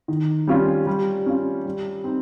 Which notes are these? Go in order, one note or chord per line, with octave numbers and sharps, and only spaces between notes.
D#3
G3 C#4 F4
G3
C#4 F4
G3
C4 D#4